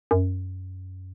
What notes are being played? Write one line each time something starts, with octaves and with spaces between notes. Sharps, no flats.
F#2